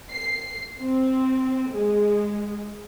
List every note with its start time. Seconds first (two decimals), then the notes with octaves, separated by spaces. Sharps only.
0.11 C7
0.80 C4
1.69 G#3